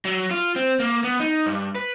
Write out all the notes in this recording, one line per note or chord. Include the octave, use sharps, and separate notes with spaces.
F#3
F4
C4
A#3
B3
D#4
G2
B4